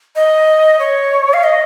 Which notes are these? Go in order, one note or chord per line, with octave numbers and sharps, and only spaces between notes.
D#5
C#5
F5
D#5